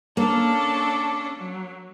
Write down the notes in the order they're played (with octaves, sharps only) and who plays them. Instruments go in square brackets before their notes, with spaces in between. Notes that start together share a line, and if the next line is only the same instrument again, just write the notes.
[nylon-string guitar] A#3 [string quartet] C#4 D4 A4
[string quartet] F#3